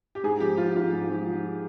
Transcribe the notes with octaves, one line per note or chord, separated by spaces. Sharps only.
G4
G#2 G#4
F3 G4
F3 F4
G#2 F4
G#2
F3
F3